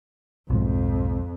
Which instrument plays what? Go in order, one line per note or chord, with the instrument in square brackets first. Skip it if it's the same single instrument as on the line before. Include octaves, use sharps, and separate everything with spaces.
[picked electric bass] B1 G#2 F3 [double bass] F2